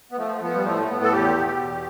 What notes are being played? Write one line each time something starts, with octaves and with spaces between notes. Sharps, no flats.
B3
F3 A3
A3
F3 B3
G3
A2 A3
A3
A2 B3
A4
E2 G4
B2
E2